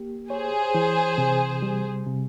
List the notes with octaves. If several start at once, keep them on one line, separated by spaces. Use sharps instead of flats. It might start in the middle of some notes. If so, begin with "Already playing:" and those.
Already playing: A#3 G4
G#4 C5 C#5
E3
C3
G3
C3